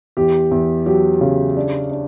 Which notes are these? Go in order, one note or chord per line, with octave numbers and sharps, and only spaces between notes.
E2 G4
E2
F#3 G4
C#3
D4
D4